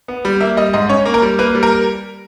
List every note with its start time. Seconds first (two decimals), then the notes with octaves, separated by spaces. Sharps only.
0.08 B3
0.25 G3
0.40 A#3 E5
0.57 G3 D#5
0.73 G#2 D#5
0.89 C#4 C#5
1.05 A#3
1.14 A#4
1.22 G3
1.39 A#3 B4
1.55 G3
1.63 A#4